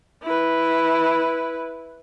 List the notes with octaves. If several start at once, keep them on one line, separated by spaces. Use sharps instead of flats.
E4 B4